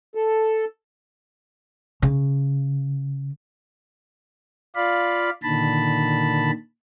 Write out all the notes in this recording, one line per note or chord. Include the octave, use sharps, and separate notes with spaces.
A4
C#3
F4 D5 F5 B5
A#2 D3 D#3 A5 B5